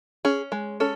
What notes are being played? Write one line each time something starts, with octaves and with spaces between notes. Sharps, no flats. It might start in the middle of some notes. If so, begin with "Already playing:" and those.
C#4 G#4
G#3
C#4 A4